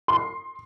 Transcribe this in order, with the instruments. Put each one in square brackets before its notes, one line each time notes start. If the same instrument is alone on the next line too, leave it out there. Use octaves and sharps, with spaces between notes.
[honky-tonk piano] C6